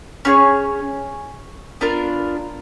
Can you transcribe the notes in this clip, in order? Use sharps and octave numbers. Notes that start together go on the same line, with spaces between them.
C#4 F4 G#4 C#5
B3 D4 F4 A#4